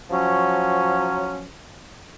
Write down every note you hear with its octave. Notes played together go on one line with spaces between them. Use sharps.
F3 F#3 C#4